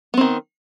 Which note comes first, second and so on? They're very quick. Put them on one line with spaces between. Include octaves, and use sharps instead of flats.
B3 C4 D#3